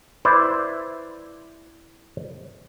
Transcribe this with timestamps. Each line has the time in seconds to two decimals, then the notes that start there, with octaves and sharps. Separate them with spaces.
0.25 E4 B4 C5 D5